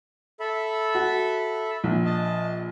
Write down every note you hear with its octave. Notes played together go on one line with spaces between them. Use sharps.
A4 E5 B5
F#4
A#1
D#5 A5